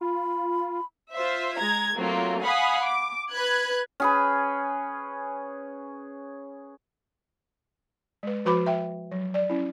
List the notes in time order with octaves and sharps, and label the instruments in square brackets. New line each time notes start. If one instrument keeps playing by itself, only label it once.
[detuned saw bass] F4 [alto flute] B5
[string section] F4 C5 E5
G#3 A#5 G#6
F#3 A3 A#3 C4 F4
F5 F#5 G#5 B5 D#6
D6
B4 F#6 G#6
[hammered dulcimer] C#4 G#4 B4
[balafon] G#3 B4
F3 F#4 B4 B5 D6
E5 G5
F#3
D5
C#4 E4